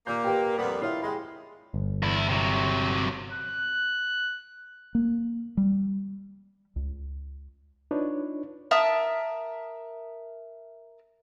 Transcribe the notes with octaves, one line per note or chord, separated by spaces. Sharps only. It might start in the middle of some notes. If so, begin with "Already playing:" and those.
A#2 A#3 G6
G4 B4 G5
F2 G3 B3 A#4
E4 F4 C#5 G5
G#3 G5 B5
G1
E2 E4
C3 F#3
F#6
A#3
G3
C#2
D4 D#4 F4 B4 C#5
A#4 E5 A5 D#6